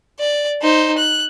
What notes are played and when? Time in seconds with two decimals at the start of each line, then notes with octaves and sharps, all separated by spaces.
0.19 D5
0.62 D#4 C5
0.98 F#6